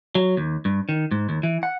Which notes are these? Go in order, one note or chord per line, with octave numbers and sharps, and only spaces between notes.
F#3
D#2
G2
D#3
G#2
D#2
E3
F#5